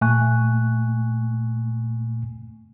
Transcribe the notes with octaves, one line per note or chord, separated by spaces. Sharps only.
A#2 A3 A#3 G#5 C#6 F#6